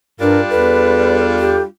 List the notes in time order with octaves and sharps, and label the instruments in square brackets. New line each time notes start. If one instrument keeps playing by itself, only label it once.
[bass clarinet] G2 [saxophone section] G3 D4 F4 [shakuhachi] A#4
[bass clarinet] E2 [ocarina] A4 [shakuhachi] B4
[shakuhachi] G4